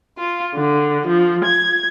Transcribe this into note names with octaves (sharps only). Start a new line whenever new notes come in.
F4
D3
F3
G#6